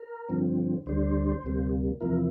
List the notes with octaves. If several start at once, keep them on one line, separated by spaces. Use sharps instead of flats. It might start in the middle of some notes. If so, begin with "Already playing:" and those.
Already playing: A#4
G2 D3 F3 C4
D2 D3 G3 D4 C5
D2 C3 G3 A#3
E2 C3 F3 A#3 E4 A#4